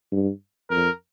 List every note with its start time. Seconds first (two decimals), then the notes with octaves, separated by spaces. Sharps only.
0.12 G2
0.70 F2 A#4